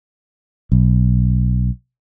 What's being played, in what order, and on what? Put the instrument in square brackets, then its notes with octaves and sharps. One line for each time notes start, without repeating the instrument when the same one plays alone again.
[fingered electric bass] B1